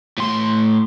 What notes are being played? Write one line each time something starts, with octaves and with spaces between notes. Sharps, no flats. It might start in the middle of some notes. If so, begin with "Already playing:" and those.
A2 C6